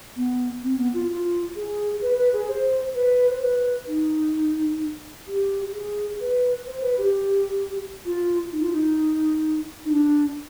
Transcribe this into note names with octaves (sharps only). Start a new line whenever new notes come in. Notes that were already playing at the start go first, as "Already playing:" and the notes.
B3
C4
B3
F4
F4
G#4
B4
B4
G#4
C5
B4
C5
B4
D#4
G4
G#4
B4
C5
B4
G4
F4
D#4
F4
D#4
D#4
D4